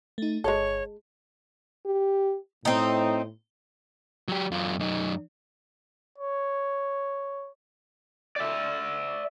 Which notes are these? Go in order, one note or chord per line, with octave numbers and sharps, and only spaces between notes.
A3 D#4
G1 G#3 A4 C#5
G4
A2 C4 D#4
F#3 G4
F#2 F4
F#2 D#4
C#5
D5 E5